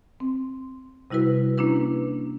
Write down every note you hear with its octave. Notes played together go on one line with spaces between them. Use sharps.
C4
C3 G3 E4 F#4 B4
A#3 C#4 D4 E4 B4